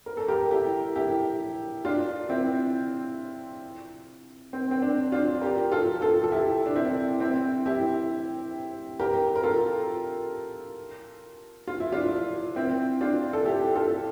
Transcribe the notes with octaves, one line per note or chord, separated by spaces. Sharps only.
A#4
A4
G4 A#4
E4 G4
E4 G4
D4 F4
C4 E4
C4
C4
D4
D4 F4
G4 A#4
F4 A4
F4 A4
A4
E4 G4
D4
C4 E4
C4 E4
E4 G4
G4 A#4
A#4
F4 A4
F4
E4
D4 F4
C4 E4
D4 F4
A4
E4 G4
F4 A4